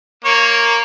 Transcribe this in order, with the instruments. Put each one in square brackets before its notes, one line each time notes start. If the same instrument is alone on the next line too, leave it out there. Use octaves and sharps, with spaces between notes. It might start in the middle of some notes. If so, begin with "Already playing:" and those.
[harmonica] A#3 C#5